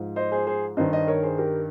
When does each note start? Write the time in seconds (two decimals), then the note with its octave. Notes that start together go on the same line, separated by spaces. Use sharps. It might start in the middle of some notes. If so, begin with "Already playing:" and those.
Already playing: G#2 F3
0.16 C5 D#5
0.32 G#4 C5
0.47 G#4 C5
0.77 G2 D#3 C5 D#5
0.92 C5 D#5
1.07 A#4 C#5
1.23 G#4 C5
1.38 G4 A#4